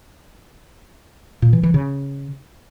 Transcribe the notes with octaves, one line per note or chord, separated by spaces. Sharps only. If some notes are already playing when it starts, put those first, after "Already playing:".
A#2
E3
E3
C#3